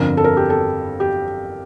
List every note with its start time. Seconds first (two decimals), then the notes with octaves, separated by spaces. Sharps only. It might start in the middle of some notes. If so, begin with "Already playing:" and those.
Already playing: G1 F2 D3 A#4
0.17 A4
0.24 A#4
0.37 G4
0.50 A4
1.00 G4